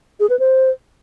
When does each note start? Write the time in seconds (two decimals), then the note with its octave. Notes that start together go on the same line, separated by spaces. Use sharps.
0.20 G#4
0.30 B4
0.39 C5